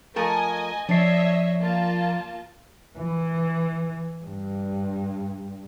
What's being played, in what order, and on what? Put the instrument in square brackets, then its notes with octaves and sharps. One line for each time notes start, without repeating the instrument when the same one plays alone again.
[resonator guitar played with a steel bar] F3 A3 A#4 [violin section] D#5 G#5
[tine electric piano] F3 C7 [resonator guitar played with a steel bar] D4 [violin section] C#5 D#5 E5
[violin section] A#3 F4 A5
[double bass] E3
G2